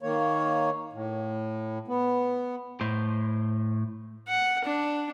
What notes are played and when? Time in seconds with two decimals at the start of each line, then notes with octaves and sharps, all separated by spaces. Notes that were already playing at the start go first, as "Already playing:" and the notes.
0.02 D#3 A#3 C#5
0.93 A2
1.88 B3
2.81 A2 C5
4.28 F#5
4.65 D4